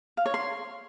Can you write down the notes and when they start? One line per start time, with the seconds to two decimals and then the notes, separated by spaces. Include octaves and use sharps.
0.17 F5
0.26 C#5
0.34 C6